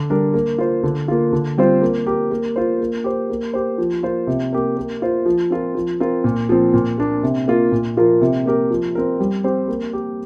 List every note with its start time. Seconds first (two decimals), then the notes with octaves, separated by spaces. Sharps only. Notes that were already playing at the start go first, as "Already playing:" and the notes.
Already playing: D3
0.10 G3 D4 A#4
0.34 A#3
0.58 F4 C5
0.83 D3
1.08 A#3 F4
1.33 D3
1.58 G3 C4 F4 C5
1.81 A#3
2.06 G4 A#4
2.31 A#3
2.56 F4 C5
2.80 A#3
3.04 G4 C5
3.30 A#3
3.53 G4 C5
3.78 F3
4.03 A#3 F4 C5
4.27 C3
4.53 A#3 G4 A#4
4.77 A#3
5.02 F4 C5
5.26 F3
5.50 C4 F4 A#4
5.75 F3
6.00 C4 F4 A#4
6.24 A#2
6.49 F3 C4
6.74 A#2
6.98 A#3 D4
7.23 C3
7.48 A#3 F4
7.72 A#2
7.97 F3 A#3 F4 A#4
8.21 C3
8.46 A#3 G4 A#4
8.70 F3
8.95 C4 A#4
9.20 G3
9.44 C4 G4 C5
9.68 A#3
9.93 G4 A#4